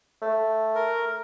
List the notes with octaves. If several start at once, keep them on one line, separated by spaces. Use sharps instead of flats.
A3
A#4